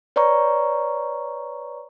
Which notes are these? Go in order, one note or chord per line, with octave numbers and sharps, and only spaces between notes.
B4 C#5 D5 A#5 C#6